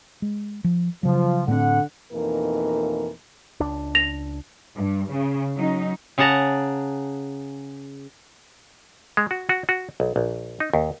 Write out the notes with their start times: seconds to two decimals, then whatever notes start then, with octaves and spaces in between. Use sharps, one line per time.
0.22 G#3
0.64 F3
1.03 C#3 F3 F#3
1.48 A2 D3 B3 C4 F#5
2.12 F2 B2 E3 A#3 D#4 A#4
3.60 C#2 D4
3.95 A#6 F7
4.76 G2
5.11 C#3
5.55 F#3 C#4 D#4
6.18 C#3 G#4 F#5 A5 A#5
9.17 G#3
9.31 F#4
9.49 F#4
9.69 F#4
10.00 B1
10.16 A#1
10.60 D#4
10.74 D#2